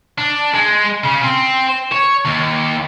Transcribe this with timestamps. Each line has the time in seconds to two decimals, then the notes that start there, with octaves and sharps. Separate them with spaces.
0.18 D4
0.54 G#3
1.04 C#3
1.23 C4
1.92 C#5
2.25 D#2